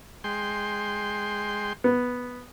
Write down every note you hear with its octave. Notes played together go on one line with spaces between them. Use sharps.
G#3 G5 C6
B3